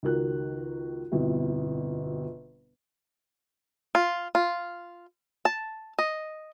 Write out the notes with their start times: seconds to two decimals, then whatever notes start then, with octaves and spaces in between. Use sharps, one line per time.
0.03 C#2 D#3 F#4 A#4 F#6
1.12 G1 F2 B2 C4 E4
3.95 F4
4.35 F4
5.45 A5
5.99 D#5